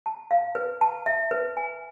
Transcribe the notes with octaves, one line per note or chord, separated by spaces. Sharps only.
A5
F5
B4
A5
E5
B4
G#5